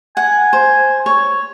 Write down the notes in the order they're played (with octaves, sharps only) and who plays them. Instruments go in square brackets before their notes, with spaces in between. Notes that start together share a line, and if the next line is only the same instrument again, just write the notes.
[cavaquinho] F#5 [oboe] G#5
[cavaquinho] C5
C#5